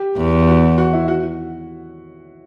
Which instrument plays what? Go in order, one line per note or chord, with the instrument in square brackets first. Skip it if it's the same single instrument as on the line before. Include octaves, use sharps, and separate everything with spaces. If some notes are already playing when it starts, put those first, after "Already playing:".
Already playing: [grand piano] G4
[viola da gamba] E2
[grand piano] F#4
F#4
E4
F#4